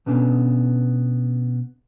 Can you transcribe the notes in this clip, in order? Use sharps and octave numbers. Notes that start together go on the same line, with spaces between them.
B2 B3 C#4 D4